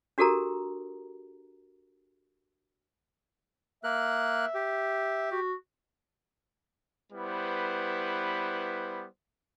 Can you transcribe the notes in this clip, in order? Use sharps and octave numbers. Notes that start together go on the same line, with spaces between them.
D4 F#4 G4 A4 A#4 A#5
A#3 A#4 E5 F#6
G4
F#4
G3 B3 E4 B4 C5